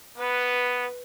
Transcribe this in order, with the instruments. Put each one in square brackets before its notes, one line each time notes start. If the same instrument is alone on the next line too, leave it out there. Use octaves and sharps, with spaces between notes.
[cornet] B3 [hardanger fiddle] B4